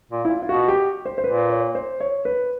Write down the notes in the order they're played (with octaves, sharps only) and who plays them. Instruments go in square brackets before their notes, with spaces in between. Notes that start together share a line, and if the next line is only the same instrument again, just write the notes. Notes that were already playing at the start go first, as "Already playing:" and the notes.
[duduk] A#2
[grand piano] E4
F4
F4
[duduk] B2 [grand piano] F#4
[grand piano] G4
C5
C5
[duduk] A#2 [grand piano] B4
[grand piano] C#5
C5
C#5
B4